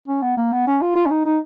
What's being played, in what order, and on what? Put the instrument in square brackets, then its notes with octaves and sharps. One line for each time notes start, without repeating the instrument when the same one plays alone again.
[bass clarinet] C#4
B3
A#3
B3
C#4
F4
F4
C#4
D#4
D#4